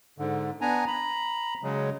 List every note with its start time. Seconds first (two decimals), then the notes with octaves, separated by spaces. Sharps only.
0.18 G#2 D3
0.61 B3 D4 G#5 A#5
0.87 A#5 B5
1.63 C#3 F#3 G#3